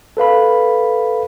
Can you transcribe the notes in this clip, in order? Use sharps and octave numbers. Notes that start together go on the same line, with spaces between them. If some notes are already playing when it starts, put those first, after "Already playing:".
A4 B4 F5 B5